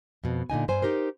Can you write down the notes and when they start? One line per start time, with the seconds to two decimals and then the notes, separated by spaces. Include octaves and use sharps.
0.24 F2 B2
0.50 A#2 D3 D#4 G#5
0.68 G2 C5 G#5
0.82 D#4 G4 A#4 C5